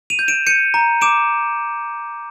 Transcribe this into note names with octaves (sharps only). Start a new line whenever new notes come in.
D#7 F7
G6
D7 E7
G6 C#7 D#7
A#5
D6 D7 E7